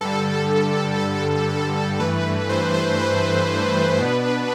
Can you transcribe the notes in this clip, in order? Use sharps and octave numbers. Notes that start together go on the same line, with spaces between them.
G2 D3 G3 A4
A4
A4
G2 E3 A3 B4
C5
C5
B4
B2 B3 D4